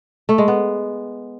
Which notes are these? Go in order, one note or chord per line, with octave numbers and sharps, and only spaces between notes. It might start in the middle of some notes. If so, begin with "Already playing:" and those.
A3
G#3
B3